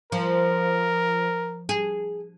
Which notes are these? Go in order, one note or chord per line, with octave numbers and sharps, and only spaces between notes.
F3 A#4
G#4